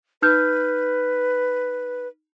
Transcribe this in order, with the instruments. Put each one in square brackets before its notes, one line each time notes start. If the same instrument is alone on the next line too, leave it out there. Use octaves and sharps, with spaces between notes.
[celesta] D#4 F6 G6 [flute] B4